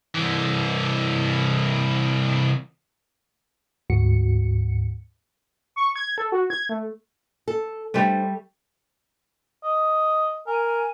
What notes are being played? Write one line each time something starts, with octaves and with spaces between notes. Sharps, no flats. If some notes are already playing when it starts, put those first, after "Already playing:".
C2 E3
D2 G#2 F#4 C#7
C#6
G#6
A4
F#4
G#6
A3
A4
G3 A3 D4 C5
D#5
A#4 G#5